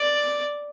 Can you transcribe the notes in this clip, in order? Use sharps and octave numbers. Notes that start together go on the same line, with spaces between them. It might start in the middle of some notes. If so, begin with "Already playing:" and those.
Already playing: D5